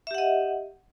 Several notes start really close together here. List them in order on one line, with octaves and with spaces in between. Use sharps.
E5 G4 F#5 D#5